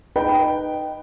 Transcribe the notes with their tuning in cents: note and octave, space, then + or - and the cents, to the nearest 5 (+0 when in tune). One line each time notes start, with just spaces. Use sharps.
D#4 -15 B4 +5 G5 -10